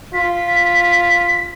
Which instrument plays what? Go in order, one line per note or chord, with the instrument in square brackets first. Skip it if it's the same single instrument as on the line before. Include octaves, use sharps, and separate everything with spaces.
[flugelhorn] F4 [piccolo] B6